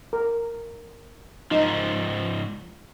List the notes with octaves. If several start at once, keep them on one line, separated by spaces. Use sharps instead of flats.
A#4
G#2 F3 D#4